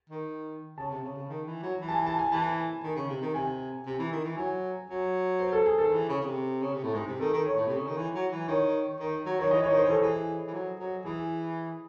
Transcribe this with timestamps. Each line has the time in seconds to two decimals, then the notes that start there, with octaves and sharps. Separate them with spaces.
0.10 D#3
0.78 C#3 A5
0.91 C3
1.03 C#3
1.16 C#3
1.29 D#3
1.47 E3
1.63 F#3
1.81 E3
1.88 A5
1.94 G#5
2.06 A5
2.19 G#5
2.32 E3 A5
2.83 D#3
2.96 C#3
3.09 C3
3.22 D#3
3.34 C3 G#5
3.86 C3
3.99 E3
4.12 D#3
4.24 E3
4.37 F#3 G#5
4.89 F#3
5.40 C5
5.52 A4
5.66 G#4
5.78 D#3 A4
5.92 E3
6.09 C#3
6.20 C#3
6.26 C3
6.62 C#3
6.73 C3
6.83 A2
6.94 G#2 G#4
7.07 C3
7.19 D#3 A4
7.33 D#3
7.45 C#5
7.56 A2
7.67 C3
7.77 C#3
7.87 D#3
7.97 E3
8.14 F#3
8.31 E3
8.48 D#3 C#5
9.00 D#3
9.26 F#3
9.39 D#3 C#5
9.51 E3 D#5
9.63 E3 C#5
9.69 D#3
9.77 C5
9.85 E3 A4
10.02 E3 G#4
10.47 E3
10.54 F#3
10.79 F#3
11.05 E3 G#4